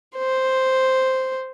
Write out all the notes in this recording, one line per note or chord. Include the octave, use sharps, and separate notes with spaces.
C5